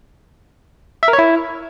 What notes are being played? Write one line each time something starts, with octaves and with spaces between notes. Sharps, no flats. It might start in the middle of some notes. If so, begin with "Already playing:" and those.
E5
A#4
C#5
E4